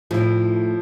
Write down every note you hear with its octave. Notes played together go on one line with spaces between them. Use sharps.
A2 F3 E4